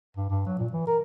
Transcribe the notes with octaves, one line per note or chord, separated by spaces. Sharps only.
G2
G2
F#3
A#2
E3
A#4